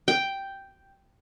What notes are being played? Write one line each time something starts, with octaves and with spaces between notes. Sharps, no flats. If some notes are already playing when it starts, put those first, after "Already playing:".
G5